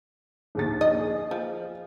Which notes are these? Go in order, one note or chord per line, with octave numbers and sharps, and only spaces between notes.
A#1 D#2 A6
D#5
G#4
F3